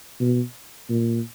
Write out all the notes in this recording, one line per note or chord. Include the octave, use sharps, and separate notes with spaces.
B2
A#2